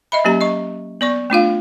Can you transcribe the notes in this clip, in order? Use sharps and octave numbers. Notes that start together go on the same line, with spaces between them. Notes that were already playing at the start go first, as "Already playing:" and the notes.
D#5 E5 B5
F#3 A#3 C#4 G4 A#5
D#5 C#6
B3 D5 C#6
A3 D4 F4 F5